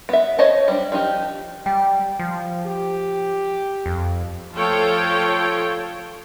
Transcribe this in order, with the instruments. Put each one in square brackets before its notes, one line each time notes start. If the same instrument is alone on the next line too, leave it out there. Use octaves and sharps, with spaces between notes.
[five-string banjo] B3 E5
C5 C#5 D#5 A5
G3 D4
F3 D4 D#4 G4
[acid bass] G3 [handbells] G5
[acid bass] F3
[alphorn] G4
[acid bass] F2
[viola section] F3 A3 F4 A4 C#5 G5